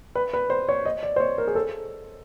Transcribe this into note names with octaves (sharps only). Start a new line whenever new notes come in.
B4
B4
C5
C#5
D#5
D5
C5
C#5
A#4
G#4
A4